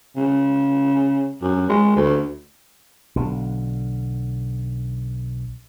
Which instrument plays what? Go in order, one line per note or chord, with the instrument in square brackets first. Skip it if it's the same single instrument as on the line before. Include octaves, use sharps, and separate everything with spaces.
[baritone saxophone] C#3
F#2
G#3
D2
[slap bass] B1 D3